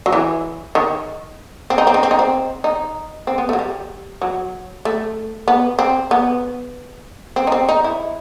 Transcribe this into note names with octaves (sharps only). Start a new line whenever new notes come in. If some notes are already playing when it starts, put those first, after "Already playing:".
F#3
E3
D#3
C4
D#4
C4
D#4
C4
D#4
C4
D#4
C4
B3
A3
F#3
G3
F#3
A3
B3
C4
B3
C4
D#4
C4
D#4
E4